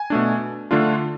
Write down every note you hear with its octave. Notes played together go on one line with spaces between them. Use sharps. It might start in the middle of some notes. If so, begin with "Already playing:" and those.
Already playing: G#5
B2 A3 D4
D3 A3 D4 F4